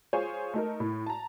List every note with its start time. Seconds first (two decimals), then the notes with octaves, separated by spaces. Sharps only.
0.13 F4 G#4 C5 C#5 G#5
0.54 A3 D#4 A#4
0.80 A2
1.06 A5 A#5